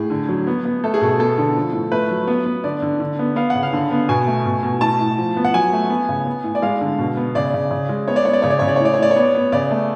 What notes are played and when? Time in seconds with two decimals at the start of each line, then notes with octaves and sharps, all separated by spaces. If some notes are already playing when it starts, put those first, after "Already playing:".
Already playing: A2 G#4
0.10 D3
0.29 F#3
0.47 B3
0.65 B3
0.84 A3 A4
0.94 G#4
1.01 B2 A4
1.19 B3 A4
1.38 D3
1.56 F3
1.73 A2
1.92 A3 B4
2.10 F#3
2.27 B3
2.46 B3
2.64 D3 D5
2.82 D3
3.00 D3
3.19 B3
3.36 B3 F5
3.50 C#3 F#5
3.63 F5
3.73 D3
3.91 B3
4.09 B2 G#5
4.27 A3
4.46 B2
4.63 B2
4.81 A2 A5
5.00 A2
5.18 F3
5.36 B3
5.45 F#5
5.54 F#3 G#5
5.73 A3
5.90 B3
6.09 C#3
6.26 B3
6.44 A2
6.55 D5
6.62 G#3 F5
6.81 D3
6.98 B2
7.17 B3
7.35 C#3 D5
7.54 C#3
7.71 C#3
7.89 G#3
8.08 B3 C#5
8.16 D5
8.25 B3 C#5
8.33 D5
8.42 C#3 C#5
8.50 D5
8.59 C#3 C#5
8.68 D5
8.76 C#5
8.80 A2 D5
8.94 C#5
8.99 A2 D5
9.11 C#5
9.16 B3
9.35 B3
9.52 C#3 D5
9.71 A3